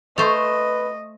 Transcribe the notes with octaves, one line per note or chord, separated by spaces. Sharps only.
A3 B4 C5 D#5 C6 C#6 F7